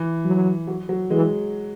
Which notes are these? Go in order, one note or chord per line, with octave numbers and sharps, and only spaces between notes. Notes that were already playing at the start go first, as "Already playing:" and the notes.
Already playing: E3
F#3
F#3
F#3
E3 G#3